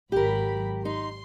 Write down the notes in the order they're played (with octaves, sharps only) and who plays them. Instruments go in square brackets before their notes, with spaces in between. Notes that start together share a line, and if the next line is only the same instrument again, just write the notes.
[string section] G#1 F#3 B5 [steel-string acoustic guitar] G4 A#4
[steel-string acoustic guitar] D#4 [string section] C6